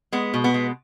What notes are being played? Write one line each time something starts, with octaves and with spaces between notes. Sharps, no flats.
G#3 B3
B2
B3
G#3